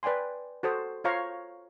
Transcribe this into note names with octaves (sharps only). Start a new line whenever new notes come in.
B4 D5 G5 G#5 C6
F#4 A4 C5 D#6
F4 C5 C#5 F5 A#5 C#6